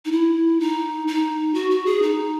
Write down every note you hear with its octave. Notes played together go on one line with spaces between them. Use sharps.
D#4
E4
D#4
D#4
F#4
F#4
G#4
D#4